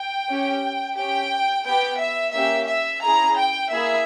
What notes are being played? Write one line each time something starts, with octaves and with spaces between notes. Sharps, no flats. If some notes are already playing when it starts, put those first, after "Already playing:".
Already playing: G5
C#4 G4
C#4 G4 G5
B3 G4 G5
E5
A#3 C#4 G4 E5
E5
C#4 E4 G#4 A#5
G5
A#3 E4 G#4 E5